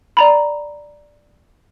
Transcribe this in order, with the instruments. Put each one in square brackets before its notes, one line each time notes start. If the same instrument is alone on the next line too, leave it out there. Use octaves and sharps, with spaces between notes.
[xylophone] D5 A#5 B5